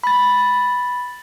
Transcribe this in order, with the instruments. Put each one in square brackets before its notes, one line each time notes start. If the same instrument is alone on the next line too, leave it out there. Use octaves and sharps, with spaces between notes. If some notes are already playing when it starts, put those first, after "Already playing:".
[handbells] B5 A6